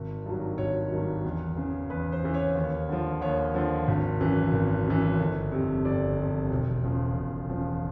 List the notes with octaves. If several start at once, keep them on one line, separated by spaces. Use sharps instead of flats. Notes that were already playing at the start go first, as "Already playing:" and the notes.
Already playing: G#1
G2 D#3 F#3
G#1 C#5
G2 D#3 F#3
E2
C#3 E3
E2 B4
C5
C#3 E3
C#5
D#2
D3 F3
D#2 C#5
D3 F3
G#1
F#2 C#3 E3
G#1
F#2 C#3 E3
G1
F2 C3
G1 D5
F2 C3
E1
E2 C#3 F3
E1
E2 C#3 F3